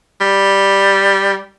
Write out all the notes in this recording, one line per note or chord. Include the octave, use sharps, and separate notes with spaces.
G3